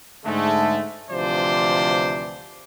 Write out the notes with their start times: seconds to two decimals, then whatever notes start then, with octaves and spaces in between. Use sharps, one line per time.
0.26 G#2 D3 G#3 A3
1.11 D2 C3 E3 F3 C5 D5